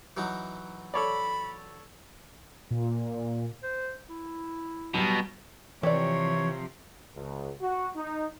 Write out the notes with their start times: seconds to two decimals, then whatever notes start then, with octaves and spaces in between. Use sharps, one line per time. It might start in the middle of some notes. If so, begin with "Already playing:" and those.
0.17 E3 F#3 D#4
0.94 A4 C#5 D5 B5
2.71 A#2
3.63 C5
4.09 E4
4.94 B2 F#3 G3
5.83 C3 E3 F3 G4 C#5 D5
7.16 C#2
7.62 F#4
7.96 D#4